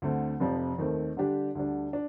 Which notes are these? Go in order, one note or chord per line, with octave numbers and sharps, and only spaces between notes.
D2 D3 A3 C4
F1 F2 C3 F3
D#2 D#3 A3 C4
D3 G3 D4 G4
D2 D3 G3 D4
D4